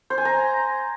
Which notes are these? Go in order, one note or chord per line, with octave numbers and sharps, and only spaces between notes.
C5
G#5
A#5